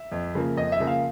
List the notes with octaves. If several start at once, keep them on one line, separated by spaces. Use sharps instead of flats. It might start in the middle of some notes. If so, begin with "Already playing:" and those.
Already playing: E5
F2
C#3 F3 A#3
F2 D#5
E5
C#3 F3 A#3
F5